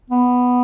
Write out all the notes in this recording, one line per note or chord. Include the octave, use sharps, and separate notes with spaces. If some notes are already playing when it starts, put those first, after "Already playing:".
B3